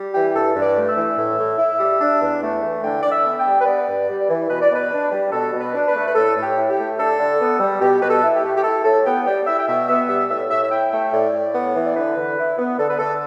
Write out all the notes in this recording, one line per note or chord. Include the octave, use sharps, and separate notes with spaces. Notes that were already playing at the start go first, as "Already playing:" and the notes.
Already playing: G3
E3 G4
G2 A4
G2
D5
A3
E5
E3
A2
A2
E4
G3
D4
E2
A3
E3
D3 G5
D3 D5
E5
B3
G5
G3
B4
B3 D5
G2
G3
E3
B2 B4
D5
B2
B4
D4
G3
B2 A4
B2
B4
D4
B4
A3
B4
A2 A4
A2
G4
E4
G4
A3
D4 A4
D3
B3
G3
B2 G4
B2 B4
A4
E4
G4
A3
G4
E4 A4
A2 A4
B3 G5
G3 G5
E4 E5
G5
B2 E5
B3 E5
G3 E5
A2 E5
A2 E5
E5
E4 G5
A3 G5
E5
A2 D5
A2
B3
E3
D5
D3 B4
D3
E4
B3
D3 A4
B4
D3 A4